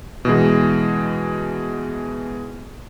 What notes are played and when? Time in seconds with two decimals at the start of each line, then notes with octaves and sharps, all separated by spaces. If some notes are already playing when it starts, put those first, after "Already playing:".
0.25 B2 E3 G#3